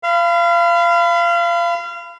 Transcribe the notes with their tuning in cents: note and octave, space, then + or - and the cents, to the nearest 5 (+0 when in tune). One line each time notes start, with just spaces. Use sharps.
F5 -25 B5 +30